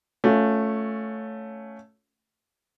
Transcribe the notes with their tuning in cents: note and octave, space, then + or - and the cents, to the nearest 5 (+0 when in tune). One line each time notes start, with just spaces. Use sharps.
A3 +0 C#4 +5 F4 +20